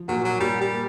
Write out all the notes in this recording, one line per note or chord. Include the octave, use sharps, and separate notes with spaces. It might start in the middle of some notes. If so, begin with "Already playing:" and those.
Already playing: F3
A#2 F#3
F#3
A#2 G3
G3
A#3